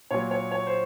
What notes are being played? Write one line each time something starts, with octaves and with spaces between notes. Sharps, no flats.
A#2 F#3 C#5
C#5
C#5
C5